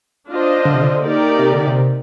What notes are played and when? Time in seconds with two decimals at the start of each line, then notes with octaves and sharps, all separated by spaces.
0.28 D4 F4 C5 D#5
0.65 D3
0.74 C3
0.81 D3
1.02 A#3 D#4 G4 A#4 D5
1.38 C3
1.53 D3
1.66 C3